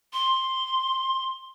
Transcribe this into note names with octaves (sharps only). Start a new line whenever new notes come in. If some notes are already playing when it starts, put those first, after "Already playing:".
C6